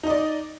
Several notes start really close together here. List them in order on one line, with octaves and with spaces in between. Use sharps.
D#4 D#5 D5